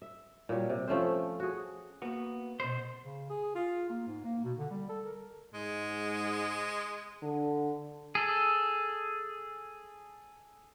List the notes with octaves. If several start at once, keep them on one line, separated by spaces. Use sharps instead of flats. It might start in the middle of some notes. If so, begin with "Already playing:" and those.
E5
A#2 F#3 G3
C3
F3 A3 C#4 C5
F#4 G#4
A#3 B3 F#4
B2 C5
C#3
G#4
F4
A#3
G#2
A#3
B2
D3
G3
A4
A#4
G#2 G#3
D3
G#4 A4